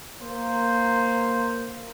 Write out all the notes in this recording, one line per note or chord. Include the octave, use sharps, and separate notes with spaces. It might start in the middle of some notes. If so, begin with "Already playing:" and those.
A#3 C5